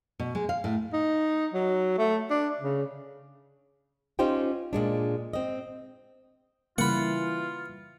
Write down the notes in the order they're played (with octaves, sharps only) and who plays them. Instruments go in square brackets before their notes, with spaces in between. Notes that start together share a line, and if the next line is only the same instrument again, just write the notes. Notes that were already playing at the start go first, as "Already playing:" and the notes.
[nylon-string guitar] B2
G#3
F5
A2
[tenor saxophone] D#4
F#3
A3
D4
C#3
[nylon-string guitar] C#4 D#4 F4 G4 C5 G5
A#2 G#3 D4
C4 D#5
[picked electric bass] C#3 G3 A#3 [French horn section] E3 [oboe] F4 [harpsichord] F#5 B5